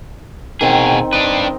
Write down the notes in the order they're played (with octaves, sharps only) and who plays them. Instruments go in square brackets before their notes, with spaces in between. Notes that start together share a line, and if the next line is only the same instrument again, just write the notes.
[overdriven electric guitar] B2 G#4 [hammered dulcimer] D#3 C4
[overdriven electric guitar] D4 B4 [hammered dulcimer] D#5